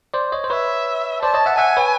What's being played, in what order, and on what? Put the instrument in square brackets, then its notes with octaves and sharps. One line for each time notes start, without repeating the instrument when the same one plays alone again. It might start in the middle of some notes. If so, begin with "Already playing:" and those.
[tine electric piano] C5 D5
C#5 D#5
C5
[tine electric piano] B4 C#5 [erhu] E5
[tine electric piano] C5 D5 [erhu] A5
[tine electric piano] C#5 D#5
E5 F#5
[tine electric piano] E5 F#5 [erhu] G#5
[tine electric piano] B4 C#5